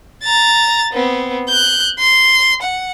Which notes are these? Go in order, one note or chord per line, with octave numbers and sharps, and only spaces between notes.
A#5 A6
B3 C4
F#6 G6
C6
F#5